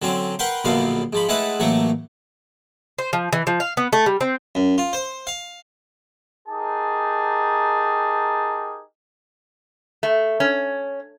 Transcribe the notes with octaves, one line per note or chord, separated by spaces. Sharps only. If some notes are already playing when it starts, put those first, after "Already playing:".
D3 F#3 C4 C#4
A#4 B4 F#5 G5 C6
A#1 F#2 B2 D3 F#3 F5
G#2 F3 B5
G#3 A3 E4 A4 B4 F#5
A1 F#3 A3 A#3 C#6
C5
F3
E3
F3
F5
B3
A3
G3
C4
F#2
F4
C5
F5
D#4 G4 G#4 A#4 A5
A3
C#4